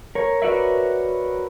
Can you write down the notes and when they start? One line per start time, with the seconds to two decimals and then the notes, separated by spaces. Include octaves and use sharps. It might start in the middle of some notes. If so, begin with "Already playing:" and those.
0.15 A#4 C#5
0.42 F#4 A#4 B4 C#5 D5 E5